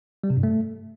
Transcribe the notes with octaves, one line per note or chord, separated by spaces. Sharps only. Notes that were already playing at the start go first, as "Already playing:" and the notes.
G3
C3
G2
A3